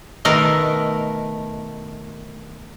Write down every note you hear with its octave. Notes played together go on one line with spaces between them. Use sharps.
B2 D#3 A3 A#4